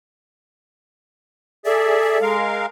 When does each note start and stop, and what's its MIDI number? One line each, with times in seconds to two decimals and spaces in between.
1.65 2.18 68
1.65 2.35 69
1.65 2.18 74
1.65 2.18 76
2.22 2.66 56
2.22 2.66 70
2.22 2.66 77